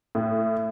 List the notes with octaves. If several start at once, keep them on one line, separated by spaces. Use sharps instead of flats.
A2